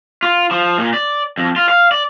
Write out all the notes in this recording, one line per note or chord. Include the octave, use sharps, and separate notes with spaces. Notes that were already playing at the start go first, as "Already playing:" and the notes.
F4
F3
A#2
D5
F2
F4
F5
D5